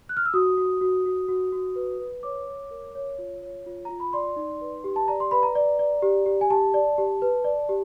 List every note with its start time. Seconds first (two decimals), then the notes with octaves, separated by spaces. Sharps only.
0.09 F#6
0.17 F6
0.26 E6
0.34 F#4 D#6
0.57 F#4
0.81 F#4
1.06 F#4
1.28 F#4
1.52 F#4
1.76 B4
2.00 B4
2.23 C#5 D6
2.47 C#5
2.71 A#4
2.95 C#5
3.19 F4
3.43 C#5
3.66 F4
3.85 F4 A#5
4.00 B5
4.13 D5 C6
4.36 D#4
4.61 B4
4.84 G4
4.96 A5
5.08 D5 A#5
5.20 C6
5.31 B4 B5
5.43 A#5
5.55 D5
5.79 D5
6.02 G4
6.26 G4
6.41 G#5
6.50 G4 A5
6.74 D5
6.98 G4
7.22 B4
7.44 D5
7.69 G4